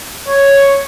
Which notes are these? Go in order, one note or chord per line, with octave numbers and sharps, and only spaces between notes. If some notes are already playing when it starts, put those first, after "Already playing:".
C#5